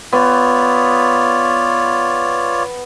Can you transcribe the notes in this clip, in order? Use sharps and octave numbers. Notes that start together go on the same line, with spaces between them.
B3 F4 C#5 D5